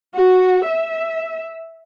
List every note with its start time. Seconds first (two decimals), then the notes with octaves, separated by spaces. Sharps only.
0.14 F#4
0.66 E5